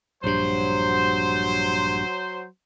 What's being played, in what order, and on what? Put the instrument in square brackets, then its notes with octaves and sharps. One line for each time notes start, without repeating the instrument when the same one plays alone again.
[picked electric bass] A#1 G2 [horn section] F#3 C5